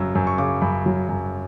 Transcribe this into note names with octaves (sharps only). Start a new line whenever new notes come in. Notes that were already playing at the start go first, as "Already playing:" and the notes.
Already playing: F#2 C#3 F#3 E6
F#2
C#6
C#3 D6
F#2 B5
F#3
F#2